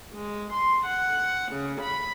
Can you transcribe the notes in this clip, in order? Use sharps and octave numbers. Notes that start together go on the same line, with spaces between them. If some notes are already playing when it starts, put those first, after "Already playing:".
G#3
C6
F#5
C#3
B5